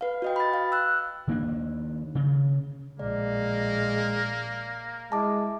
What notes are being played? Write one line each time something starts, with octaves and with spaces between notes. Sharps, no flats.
B4 F5
F#4 D#5 G5
B5 A6
F5
E6 F#6
D#3 A#3 D4
C#3
A#1 A2 G#3 A#3 D5
G#3 E4 A5 D6